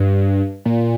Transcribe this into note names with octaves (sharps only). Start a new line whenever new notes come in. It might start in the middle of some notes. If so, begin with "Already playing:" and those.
Already playing: G2
A#2